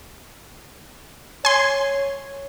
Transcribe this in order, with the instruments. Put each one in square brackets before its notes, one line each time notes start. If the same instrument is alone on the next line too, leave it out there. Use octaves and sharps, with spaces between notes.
[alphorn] C#5 [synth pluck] G#5 C6